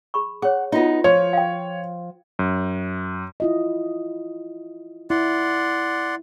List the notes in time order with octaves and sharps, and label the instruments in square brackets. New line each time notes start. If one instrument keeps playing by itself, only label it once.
[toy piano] G#4 B5 C#6
[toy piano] G#4 C#5 [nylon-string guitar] F#5
[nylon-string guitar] B3 D#4 [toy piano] F4 F#4 E5
[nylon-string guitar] F3 [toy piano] B4 [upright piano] C#5
[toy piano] F5 G5
[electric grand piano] F#2
[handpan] E4 F4 D#5
[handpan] E4 [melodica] D5 F#5 C6